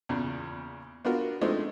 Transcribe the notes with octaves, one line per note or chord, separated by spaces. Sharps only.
E2 A#2 C#3
B3 D4 F4 F#4 A#4
F3 G#3 A3 C4 D4 D#4